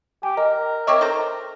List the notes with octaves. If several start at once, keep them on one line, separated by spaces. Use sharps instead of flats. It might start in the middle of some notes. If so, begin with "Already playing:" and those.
G4 G#5
A#4 D#5
C4 C#5 D#5 E5 C#6 D6
A4 C5 A#5